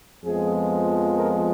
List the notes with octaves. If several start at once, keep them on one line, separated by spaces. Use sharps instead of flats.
F2 F3 G#3 B3 G#4
A#4